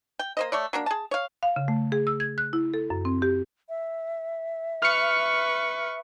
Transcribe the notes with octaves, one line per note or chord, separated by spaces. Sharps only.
G5
A#3 C5 D#5
A3 C#5 D5
F#3 A#3 D4
G#4 A5
C#5 F5
F5
C#3
A3
G#4
E6
G#6
F#6
E4
A4
F#2
C4
G4
E5
B4 C#6 F6 C#7